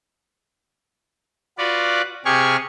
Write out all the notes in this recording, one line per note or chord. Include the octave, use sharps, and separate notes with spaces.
F4 F#4 B4 D5
C3 G4 G#4 G#5 C#6 F6